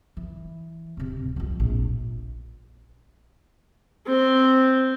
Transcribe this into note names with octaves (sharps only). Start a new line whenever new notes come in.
E3
D1 C3
C2 F2
A#1
C4